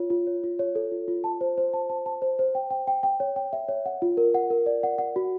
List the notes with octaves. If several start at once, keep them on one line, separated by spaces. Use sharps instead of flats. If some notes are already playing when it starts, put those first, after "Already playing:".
Already playing: F4 C#5
F4
C#5
F4
C#5
A4
F4
F4
A5
C5
C5
A5
A5
A5
C5
C5
G5
G5
G5
G5
C#5
G5
E5
C#5
F#5
F4
A#4
F#5
A#4
D5
F#5
F#5
F#4